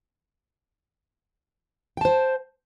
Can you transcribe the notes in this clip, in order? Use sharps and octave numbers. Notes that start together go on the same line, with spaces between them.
C5 G5 A5